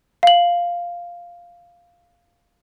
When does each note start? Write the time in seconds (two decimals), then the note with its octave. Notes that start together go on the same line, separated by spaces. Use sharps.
0.23 F5 F#7